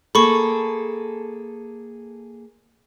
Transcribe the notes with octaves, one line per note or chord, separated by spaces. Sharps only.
A#3 G#4 A4 B5 C#6